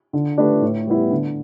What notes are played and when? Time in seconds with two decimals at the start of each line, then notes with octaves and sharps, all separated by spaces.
0.13 D3
0.38 A3 D4 G4 B4
0.62 A2
0.87 G3 B3 E4
1.11 D3